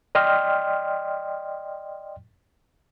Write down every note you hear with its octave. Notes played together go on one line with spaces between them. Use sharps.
D5 D#5 G5 C6 F6